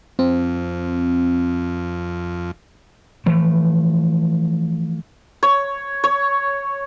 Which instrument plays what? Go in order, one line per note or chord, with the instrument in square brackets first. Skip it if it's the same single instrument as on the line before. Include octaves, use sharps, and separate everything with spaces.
[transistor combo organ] F2 [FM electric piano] C4
[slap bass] E3 F3 A3
[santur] C#5
C#5